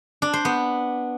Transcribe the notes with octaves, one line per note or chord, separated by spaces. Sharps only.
D4
C5
B3